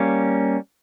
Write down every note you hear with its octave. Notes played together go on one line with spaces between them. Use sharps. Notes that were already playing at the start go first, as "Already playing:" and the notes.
Already playing: G3 A#3 C#4